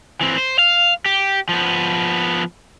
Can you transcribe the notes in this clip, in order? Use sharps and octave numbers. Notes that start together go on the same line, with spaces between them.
E3 C4
C5
F5
G4
F3 B3